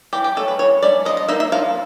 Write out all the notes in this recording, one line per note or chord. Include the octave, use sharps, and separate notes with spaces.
E3 G4
G4
A3 C#4 A4
B4
E3 C#5
A3 C#4 D5
F3 D#5
D#5
A#3 D#4 E5
E5
F3 F5